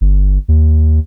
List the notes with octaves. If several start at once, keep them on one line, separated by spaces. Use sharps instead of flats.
G1
D#2